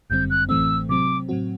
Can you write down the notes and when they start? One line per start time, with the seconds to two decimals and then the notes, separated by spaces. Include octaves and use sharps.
0.10 G1 F#2 D3 G3 C4 G6
0.30 F#6
0.49 A1 A2 E3 A3 C4 E6
0.89 C3 F#3 C4 D6
1.29 A2 F#3 C4 F#4